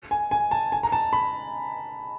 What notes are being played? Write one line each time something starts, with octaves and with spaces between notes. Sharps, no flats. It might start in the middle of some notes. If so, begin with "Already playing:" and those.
G#5
G#5
A5
G#5
A#5
A5
B5